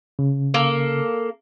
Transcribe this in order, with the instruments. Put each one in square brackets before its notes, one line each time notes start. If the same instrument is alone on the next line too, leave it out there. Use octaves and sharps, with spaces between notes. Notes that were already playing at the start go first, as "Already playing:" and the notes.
[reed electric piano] C#3
[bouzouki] A#3 A4